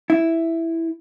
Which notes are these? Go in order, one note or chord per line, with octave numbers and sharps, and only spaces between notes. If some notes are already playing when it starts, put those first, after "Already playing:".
E4